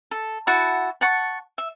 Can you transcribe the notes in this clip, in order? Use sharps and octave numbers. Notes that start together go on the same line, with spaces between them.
A4
E4 F#4 F#5 A5
F#5 A5 C#6
E5